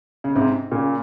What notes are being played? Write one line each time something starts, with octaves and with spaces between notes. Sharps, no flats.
C#3
G#2 C3
A#2 C#3